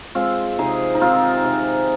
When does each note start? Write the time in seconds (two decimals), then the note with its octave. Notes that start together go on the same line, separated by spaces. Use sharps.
0.15 G#3 C4 F4
0.59 C3 D#4 G#4
0.95 D#4
1.02 D#3 C4 F4
1.44 C3